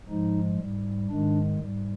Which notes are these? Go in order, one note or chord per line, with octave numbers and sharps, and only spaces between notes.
G#2 F3 G#3 D#4
G#2 G3
G#2 D#3 G#3 D4
G#2 G3